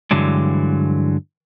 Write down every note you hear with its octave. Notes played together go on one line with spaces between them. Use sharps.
G2 D3 E3 F#3 G#3